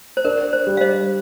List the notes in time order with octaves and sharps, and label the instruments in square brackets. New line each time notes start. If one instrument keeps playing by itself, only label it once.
[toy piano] C5
[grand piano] D4 [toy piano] A#4
[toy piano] C5
[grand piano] G3
[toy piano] F5
C5 D#5